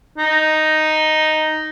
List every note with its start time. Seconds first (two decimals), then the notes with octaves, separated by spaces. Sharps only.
0.18 D#4